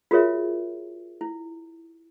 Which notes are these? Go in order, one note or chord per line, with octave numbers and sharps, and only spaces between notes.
F4 F#4 G#4 A#4 C#5 E5
E4